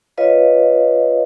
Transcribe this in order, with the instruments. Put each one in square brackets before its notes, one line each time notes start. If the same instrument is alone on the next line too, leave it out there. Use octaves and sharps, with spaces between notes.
[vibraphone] F4 B4 C#5 D#5 F5